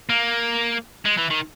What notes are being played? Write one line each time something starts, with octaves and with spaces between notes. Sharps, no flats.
A#3
G#3
E3
D#3